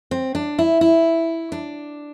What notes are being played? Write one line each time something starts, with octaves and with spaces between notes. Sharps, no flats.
C4
D4
E4
E4
D4